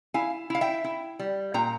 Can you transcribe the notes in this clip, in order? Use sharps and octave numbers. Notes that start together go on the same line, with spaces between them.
E4 F5 G#5
E4 F5
E5 G5
E4
G3
A#2 G5 A#5